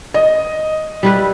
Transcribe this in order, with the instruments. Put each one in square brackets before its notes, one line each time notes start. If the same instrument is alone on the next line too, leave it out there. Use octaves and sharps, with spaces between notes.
[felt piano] D#5
[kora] G3 E4 B4